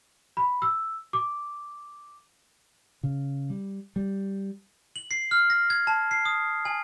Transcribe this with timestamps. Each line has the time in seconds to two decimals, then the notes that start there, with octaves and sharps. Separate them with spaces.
0.37 B5
0.62 E6
1.13 D6
3.03 C#3
3.50 G3
3.96 G3
4.96 F#7
5.11 C7
5.31 F6
5.50 A#6
5.70 G#6
5.87 A5
6.11 C7
6.25 D#6
6.65 G#5